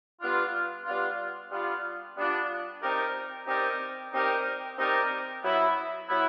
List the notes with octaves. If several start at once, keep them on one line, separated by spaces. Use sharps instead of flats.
G3 B3 D4 F4
G3 B3 D4 F4
G3 B3 D4 F4
G3 B3 D4 F4
C4 D#4 G4 A#4 D5
C4 D#4 G4 A#4 D5
C4 D#4 G4 A#4 D5
C4 D#4 G4 A#4 D5
F#3 B3 E4
F#3 B3 E4